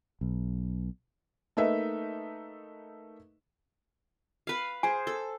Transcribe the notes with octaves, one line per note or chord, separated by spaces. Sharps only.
B1
A3 A#3 D#4 B4 E5
B4 F5
G#4 C5 G#5
A4